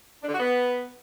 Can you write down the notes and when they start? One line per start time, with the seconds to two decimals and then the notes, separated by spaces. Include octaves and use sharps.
0.23 D4
0.28 D3
0.34 F#4
0.40 B3